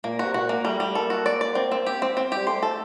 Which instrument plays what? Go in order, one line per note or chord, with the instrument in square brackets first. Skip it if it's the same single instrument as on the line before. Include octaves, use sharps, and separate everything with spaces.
[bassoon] A#2 [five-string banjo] A#3
[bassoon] C3 [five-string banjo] F#4
[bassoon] A#2 [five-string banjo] F#4
[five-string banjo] A#3
[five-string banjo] G3 [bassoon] A3
[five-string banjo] G3
[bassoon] A#3 [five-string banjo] A4
[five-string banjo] F#4
D5
D5
C4
C4
G4
C4
C4
[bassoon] G3 [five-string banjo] G4
[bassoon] A3 [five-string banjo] C5
[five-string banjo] A4